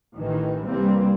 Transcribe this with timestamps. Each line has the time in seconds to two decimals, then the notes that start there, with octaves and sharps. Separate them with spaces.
0.16 A1 D#3 E3
0.66 C2 E3 G3 A#3 C4